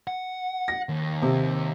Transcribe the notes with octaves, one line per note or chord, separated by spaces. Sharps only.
F#5
A#6
D#2
C3